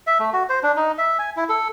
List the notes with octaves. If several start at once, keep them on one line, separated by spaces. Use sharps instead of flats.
E5
A3
F#4
C5
D4
D#4
E5
G#5
E4
A4